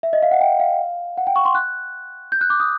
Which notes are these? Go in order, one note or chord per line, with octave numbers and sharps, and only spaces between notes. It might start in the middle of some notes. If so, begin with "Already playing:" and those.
E5
D#5
F5
F#5
G5
F5
F#5
G5
C#6
C6
F#6
G6
F#6
D6
D#6